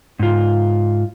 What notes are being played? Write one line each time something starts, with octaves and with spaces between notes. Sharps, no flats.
G#2 F4